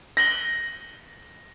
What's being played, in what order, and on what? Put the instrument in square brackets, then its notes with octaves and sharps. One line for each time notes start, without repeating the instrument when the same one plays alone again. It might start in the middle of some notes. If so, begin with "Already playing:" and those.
[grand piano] A#6 F#7 G7